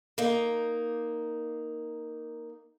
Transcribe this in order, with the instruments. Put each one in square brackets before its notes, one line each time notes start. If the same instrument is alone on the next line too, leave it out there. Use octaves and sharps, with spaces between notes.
[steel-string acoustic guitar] A#3 D#4